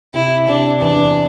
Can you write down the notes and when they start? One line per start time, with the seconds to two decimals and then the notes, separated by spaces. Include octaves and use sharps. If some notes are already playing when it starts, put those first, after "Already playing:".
0.14 C3 E4
0.48 C3 D4
0.81 E2 D4